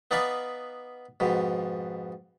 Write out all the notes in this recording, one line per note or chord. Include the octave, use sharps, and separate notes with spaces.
B3 D#4 D5 F5 G#5 B5
F2 G#2 B2